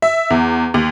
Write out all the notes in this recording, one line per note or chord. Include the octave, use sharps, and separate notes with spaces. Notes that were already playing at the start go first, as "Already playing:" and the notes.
E5
E2
D#2